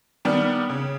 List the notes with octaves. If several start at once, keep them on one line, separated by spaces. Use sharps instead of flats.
D#3 G3 B3 D4
C#3